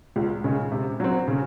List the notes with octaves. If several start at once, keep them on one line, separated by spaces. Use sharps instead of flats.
C#2
C#3 G#3
C3
F#3 C4
C#3